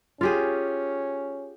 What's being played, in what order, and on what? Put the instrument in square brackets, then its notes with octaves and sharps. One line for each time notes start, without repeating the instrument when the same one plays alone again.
[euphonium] C#4 [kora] F4 G4 G#4